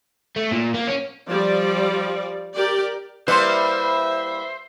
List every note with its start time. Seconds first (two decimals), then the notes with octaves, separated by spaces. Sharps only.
0.36 A3
0.52 A#2
0.74 A#3
0.87 C#4
1.28 F3 G3 D5
2.54 G4 A#4 D5
3.28 G3 A#3 E4 B4 C5 E5 C6